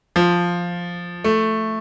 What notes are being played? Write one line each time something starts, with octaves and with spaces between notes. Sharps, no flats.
F3
A3